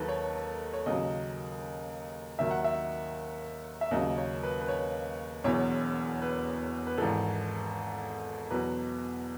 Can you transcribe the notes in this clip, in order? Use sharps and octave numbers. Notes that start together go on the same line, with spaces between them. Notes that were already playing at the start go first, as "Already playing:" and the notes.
Already playing: D#2 D#3 F#3 A4 B4
C#5
C#5
D#2 C#3 F#3 D#5
D#2 D#3 F#3 E5
F#5
E5
E5
D#2 C#3 F#3 D#5
C#5
B4
B4
C#5
E1 E2 B2 F#3 C#5
B4
B4
G#1 G#2 E3 A4
E2 B2 F#3 B4